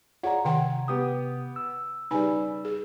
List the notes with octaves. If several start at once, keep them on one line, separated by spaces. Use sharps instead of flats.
F4 G#4 C#5 D5 F#5 A#5
C3 D#3 F#5 G5
B3 G4 D#6
E6
C#3 G3 D#4 B4 G#5
G#4